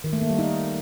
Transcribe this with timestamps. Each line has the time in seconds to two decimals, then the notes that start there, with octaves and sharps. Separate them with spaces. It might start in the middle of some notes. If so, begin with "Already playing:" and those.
0.04 D#3
0.13 A3
0.21 A#3
0.30 G3
0.39 D#4